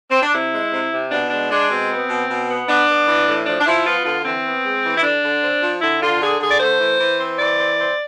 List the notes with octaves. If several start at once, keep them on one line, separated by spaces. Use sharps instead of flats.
C4
D4
C3 E4
G#3
C3
C3
B2 D4
G#3 D4
G#3 D4
B2 C4
B3
B2
B2
B3
B3 D4
B3
E3
A2
F3 D4
D4
F3 E4
B3 F4
D3 F4
E3 C4
B3
G#3
E3
E4
D3 D4
D3
C4
F3
D3 E4
D3 F4
D3 G#4
D3 G#4
D5
A3 C5
E3
E3
C4
E3 D5
C4
C4